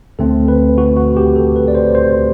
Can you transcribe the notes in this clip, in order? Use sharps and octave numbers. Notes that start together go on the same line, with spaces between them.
D2 D3 A3 C4 A4
B4
F#4
F#4
G4
A4
B4
D5
C5
C5